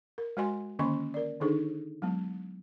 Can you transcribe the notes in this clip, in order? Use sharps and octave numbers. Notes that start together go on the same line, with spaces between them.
A#4
G#3 F#4 C5 D#5 G#5 C6
D3 D#3 A#3 C#4 D#5 C6
A#4 D5
D3 D#3 D4 D#4 G#4 A4
F#3 G#3 B3